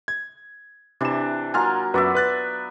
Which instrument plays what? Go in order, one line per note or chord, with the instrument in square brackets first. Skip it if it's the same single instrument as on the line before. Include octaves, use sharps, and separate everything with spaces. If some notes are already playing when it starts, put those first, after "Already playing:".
[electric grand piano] G#6
[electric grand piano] C3 E7 [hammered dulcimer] E3 D4
[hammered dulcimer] F#3 A#3 F4 [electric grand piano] G#5 F6
[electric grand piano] F#2 F#4 B4 [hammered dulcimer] B3 D5 E5
[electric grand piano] B4 F#6 A6